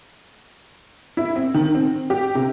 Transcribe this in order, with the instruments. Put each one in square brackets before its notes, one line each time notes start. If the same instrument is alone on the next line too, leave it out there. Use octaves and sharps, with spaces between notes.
[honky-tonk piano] E4
C4
D#3
C4
G4
C3